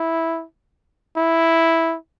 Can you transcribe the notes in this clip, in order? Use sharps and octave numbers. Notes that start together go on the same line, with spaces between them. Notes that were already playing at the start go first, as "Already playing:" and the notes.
Already playing: E4
E4